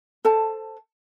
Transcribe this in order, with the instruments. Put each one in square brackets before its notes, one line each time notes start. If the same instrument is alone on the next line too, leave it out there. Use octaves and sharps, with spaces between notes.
[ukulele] A4 C5 A5